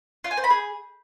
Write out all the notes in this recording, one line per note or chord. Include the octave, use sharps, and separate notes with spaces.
F4
G#5
C5
B5
G#4